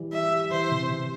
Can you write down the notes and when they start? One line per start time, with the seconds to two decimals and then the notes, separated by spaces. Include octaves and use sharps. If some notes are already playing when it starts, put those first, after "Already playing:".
Already playing: E3 G3
0.12 G3 E5
0.32 G3
0.51 E3 C5
0.71 C3
0.90 C3